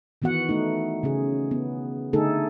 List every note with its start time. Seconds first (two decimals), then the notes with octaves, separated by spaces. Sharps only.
0.22 D#3 E3 B3 F#4 F#5
0.49 A3 D#4
1.03 C#3 C#4 G#4
1.51 B3
2.13 D3 A3 D#4 G#4 A4